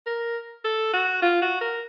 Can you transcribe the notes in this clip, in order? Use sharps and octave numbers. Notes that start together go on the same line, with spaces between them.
A#4
A4
F#4
F4
F#4
A#4